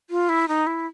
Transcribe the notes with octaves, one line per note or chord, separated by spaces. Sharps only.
F4
E4
D#4
E4